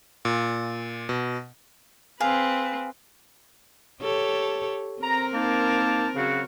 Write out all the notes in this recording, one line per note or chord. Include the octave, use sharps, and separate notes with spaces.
A#2
B2
C4 G#4 B4 F5
G4 A4 C#5
C4 A#4 A#5
A#3 D#4 A5
C#3 F#3 F#4